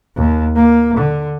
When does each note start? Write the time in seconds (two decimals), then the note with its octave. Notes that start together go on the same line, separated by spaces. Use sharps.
0.17 D#2
0.56 A#3
0.97 D3